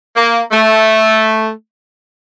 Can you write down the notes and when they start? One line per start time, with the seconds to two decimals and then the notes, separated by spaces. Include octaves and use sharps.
0.16 A#3
0.51 A3